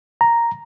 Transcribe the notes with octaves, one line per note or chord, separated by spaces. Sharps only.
A#5